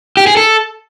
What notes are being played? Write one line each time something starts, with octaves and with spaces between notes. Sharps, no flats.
G4
G#4
A4